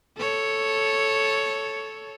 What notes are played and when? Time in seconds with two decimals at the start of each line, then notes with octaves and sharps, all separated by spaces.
0.18 A4 C#5